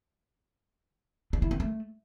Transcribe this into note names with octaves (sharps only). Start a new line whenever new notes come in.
D4
E4
C4
A3